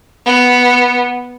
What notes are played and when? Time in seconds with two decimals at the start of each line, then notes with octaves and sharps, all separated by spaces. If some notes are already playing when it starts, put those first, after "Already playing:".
0.26 B3